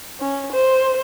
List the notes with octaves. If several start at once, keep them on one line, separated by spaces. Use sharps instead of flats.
C#4
C5